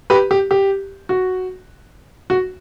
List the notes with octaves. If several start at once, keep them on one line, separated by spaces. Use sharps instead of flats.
G4 B4
G4
G4
F#4
F#4